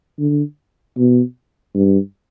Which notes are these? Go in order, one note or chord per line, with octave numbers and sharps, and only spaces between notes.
D3
B2
G2